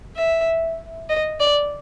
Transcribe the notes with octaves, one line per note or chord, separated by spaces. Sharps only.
E5
D#5
D5